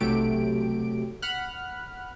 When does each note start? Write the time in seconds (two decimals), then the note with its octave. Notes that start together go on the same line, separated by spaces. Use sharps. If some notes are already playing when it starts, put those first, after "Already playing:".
0.01 B1 C3 F#3 A3 G4 D7
1.22 F#5 B5 F6 F#6